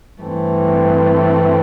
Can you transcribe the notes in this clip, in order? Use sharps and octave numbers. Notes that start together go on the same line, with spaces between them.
G2 E3 A3 C4